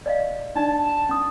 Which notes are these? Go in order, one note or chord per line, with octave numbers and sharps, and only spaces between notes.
D5 D#5 F5
D4 D#4 D5 A5
C#4 D#6